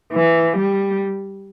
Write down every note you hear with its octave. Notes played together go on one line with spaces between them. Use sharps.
E3
G3